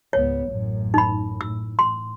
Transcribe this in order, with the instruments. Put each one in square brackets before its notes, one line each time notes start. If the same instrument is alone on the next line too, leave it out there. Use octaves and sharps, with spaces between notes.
[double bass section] C#2 G#2 B3 [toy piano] C#5
[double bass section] A1 F#2 A2
[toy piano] D#4 B5
[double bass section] A2 [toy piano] E6
[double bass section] A2 [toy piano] C6